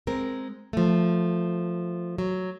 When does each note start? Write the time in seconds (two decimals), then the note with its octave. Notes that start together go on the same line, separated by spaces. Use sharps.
0.07 G#3 C4 A#4
0.73 F3 A3
2.18 F#3